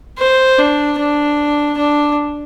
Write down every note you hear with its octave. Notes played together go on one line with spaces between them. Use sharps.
C5
D4
D4
D4